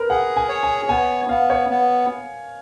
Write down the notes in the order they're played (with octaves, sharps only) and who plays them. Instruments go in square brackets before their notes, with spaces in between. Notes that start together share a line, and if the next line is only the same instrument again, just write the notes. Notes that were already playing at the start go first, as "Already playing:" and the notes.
Already playing: [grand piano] A#4 B4
[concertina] G#4 [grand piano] F#5
[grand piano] G#5
[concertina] C#5
[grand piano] G#5
[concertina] B3 [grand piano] G#5
[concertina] B3 [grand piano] F5
[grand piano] C#5
[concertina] B3